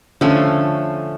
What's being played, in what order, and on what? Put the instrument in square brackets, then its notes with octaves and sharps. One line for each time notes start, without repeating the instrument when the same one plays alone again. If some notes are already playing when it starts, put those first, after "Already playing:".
[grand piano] D3 [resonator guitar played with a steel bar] F3 A3 C#4